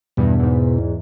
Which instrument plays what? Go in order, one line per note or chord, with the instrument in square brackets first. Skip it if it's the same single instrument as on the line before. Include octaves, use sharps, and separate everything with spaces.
[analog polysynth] E2 G2 [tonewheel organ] B2
[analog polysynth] E2 G#2